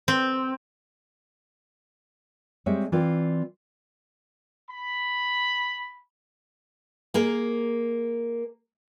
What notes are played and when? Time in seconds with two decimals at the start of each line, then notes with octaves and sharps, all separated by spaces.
0.08 C4
2.66 G3 G#3 C4 C#5 E5
2.92 E3 C4 F4 D5 F5
4.70 B5
7.14 A#3 G#4 A#4